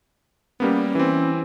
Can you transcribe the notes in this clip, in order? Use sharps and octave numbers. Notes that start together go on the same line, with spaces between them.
G3 A#3 B3 C#4
E3 C4